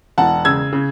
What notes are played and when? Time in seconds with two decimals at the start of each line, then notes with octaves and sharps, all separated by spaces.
0.18 E1 F#5 A5
0.45 C#3 E6 G#6
0.73 C#3